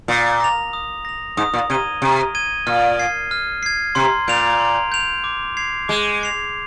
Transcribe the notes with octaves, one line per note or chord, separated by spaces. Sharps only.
A#2 D#6
A#6 F7
D#6
A#6 F7
G#2 D#6
A#2
C3 G#6 D#7 G7
C3 D#6
G#6 D#7 G7
A#2 F6
G#6 C7
F6
G#6 C7
C3 C6
A#2 G6 D7 F7
C6
G6 D7 F7
D6
G#6 C7 F7
G#3 D6
G#6 C7 F7